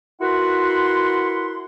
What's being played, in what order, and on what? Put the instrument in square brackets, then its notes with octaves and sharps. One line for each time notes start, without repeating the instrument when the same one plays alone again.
[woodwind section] E4 F#4 A#4 B4 F#5 C6